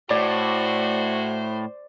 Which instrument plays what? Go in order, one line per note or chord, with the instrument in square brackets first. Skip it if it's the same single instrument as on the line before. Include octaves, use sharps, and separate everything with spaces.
[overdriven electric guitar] A2 [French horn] F#4 [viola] C5 [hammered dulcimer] D5